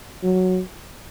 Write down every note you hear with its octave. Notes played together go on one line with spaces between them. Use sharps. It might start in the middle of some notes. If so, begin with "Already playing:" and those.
F#3